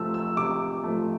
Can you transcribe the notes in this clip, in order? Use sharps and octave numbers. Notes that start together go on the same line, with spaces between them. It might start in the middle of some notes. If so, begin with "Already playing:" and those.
Already playing: C3 F3 A3 E6
E6
C3 D6
F3 A3